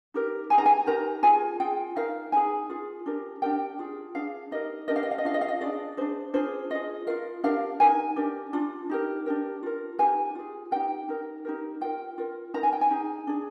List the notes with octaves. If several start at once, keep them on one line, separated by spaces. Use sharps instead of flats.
D#4 G4 A#4
D#4 G#4 G#5
A#5
G#5
D#4 G4 A#4 A#5
F4 G#4 G#5
F4 G#4 G5
D#4 A#4 F5
D#4 G#4 G#5
F4 G#4
D4 G4 A#4
D4 G4 A#4 G5
F4 G#4
D4 G#4 F5
D#4 G4 A#4 D#5
D4 G4 A#4 D#5
F5
D#5
F5
D#5
D4 F4 G#4 F5
D#5
F5
D#5
D4 F4 G#4 D5
D4 G#4 C5
D4 F4 G#4 C5
F4 G#4 D#5
F4 A#4 F5
D4 G4 A#4 F5
D#4 A#4 G#5
D4 G4 A#4
D4 F4
D#4 G4 A#4
D4 G4 A#4
F4 A#4
D#4 G4 A#4 G#5
F4 G#4
D#4 G4 A#4 G5
D#4 A#4
D#4 G4 A#4
F4 A#4 G5
F4 A#4
D#4 A#4 A#5
G#5
G5
G#5
D#4 G#4
D4 G#4